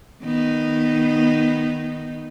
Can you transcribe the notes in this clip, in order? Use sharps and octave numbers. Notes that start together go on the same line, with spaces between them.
D#3 B3 D#4